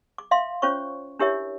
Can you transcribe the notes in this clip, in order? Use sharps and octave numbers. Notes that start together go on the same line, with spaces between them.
D6
E5 F5 C6
C#4 F4 C5 C#5 C#6
D4 E4 G4 A#4 C#5 E5